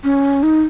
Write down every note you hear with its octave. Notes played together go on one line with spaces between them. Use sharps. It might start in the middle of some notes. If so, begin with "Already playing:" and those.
C#4
D#4